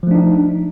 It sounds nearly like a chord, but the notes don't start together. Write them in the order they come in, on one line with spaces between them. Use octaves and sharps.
F3 A3 D4 D#4